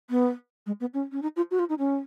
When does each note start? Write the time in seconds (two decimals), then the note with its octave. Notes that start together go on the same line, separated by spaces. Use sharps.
0.10 B3
0.66 G#3
0.80 B3
0.94 C#4
1.12 C#4
1.22 D#4
1.36 F4
1.51 F#4
1.59 F4
1.69 D#4
1.79 C#4